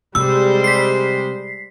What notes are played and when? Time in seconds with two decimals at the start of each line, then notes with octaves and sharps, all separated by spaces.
0.15 C3 G3 G#3 C5 E6
0.64 B6 C7